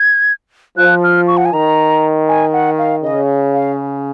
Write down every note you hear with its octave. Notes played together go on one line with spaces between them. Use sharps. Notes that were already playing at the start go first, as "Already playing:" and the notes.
Already playing: G#6
F3 F#6
F6
C#6
F#5
G#5
D#3 A#5
G#5
F#5
F5
C#3 D#5
F5